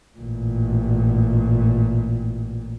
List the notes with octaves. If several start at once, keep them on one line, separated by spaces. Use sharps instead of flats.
A1 A#2